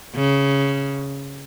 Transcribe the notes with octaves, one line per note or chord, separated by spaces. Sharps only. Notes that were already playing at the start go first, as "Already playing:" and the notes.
C#3